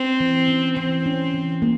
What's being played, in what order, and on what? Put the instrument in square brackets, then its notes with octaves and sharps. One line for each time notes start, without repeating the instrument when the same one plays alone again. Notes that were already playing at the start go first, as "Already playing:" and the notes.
Already playing: [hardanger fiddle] C4
[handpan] E3
C#4
[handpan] E3 [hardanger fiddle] C4
[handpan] C#4
E3
A#3